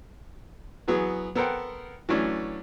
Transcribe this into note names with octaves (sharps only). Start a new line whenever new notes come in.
E3 F#3 B3 G#4
B3 A4 A#4 C5 F#5 G5
E3 F#3 A3 C#4 D4